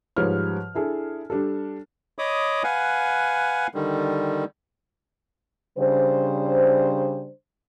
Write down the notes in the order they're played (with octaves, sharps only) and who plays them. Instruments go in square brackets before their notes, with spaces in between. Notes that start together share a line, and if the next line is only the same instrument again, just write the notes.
[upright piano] G#2 F3 G3 B4 C#5 F6
D4 E4 G#4 A4
G3 D4 G4 A4
[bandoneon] C#5 D#5 B5 D6 D#6
B4 F5 F#5 G#5
D3 D#3 G3
[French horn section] C#3 G3 D4 C5